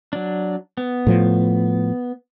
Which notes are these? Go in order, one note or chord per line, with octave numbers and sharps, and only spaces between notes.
F#3 D4
B3
A2 F3